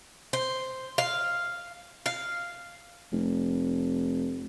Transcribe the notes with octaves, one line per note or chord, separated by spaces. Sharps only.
C5
F5
F5
F1